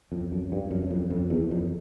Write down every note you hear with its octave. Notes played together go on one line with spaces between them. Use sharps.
F2
F#2
G2
F#2
F2
F2
E2
F2